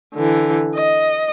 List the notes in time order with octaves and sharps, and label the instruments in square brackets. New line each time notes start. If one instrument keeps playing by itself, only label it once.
[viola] D3 E3
D#5